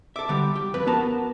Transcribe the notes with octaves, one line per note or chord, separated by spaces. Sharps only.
A4 E5 D6
D3 G3 G4
G4
F2 B4
B3 F#4 A#4 A5